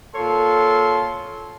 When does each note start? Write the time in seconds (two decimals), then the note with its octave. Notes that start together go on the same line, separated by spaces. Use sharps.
0.16 A#2 A4 C#5 F5 C6